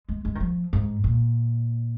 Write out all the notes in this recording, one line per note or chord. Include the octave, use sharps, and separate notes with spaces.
G#3
G#3
D#3
F3
G#2
A#2